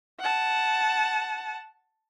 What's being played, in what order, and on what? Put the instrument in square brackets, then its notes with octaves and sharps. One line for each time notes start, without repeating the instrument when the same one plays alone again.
[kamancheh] F#5 A5